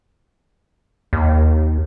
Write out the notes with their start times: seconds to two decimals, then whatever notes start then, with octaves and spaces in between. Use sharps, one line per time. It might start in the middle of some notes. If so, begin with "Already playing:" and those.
1.13 D#2